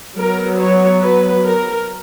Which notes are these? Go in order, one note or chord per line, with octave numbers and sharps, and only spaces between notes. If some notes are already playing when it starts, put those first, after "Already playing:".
F#3 B3 A#4
C#5
B4
A#4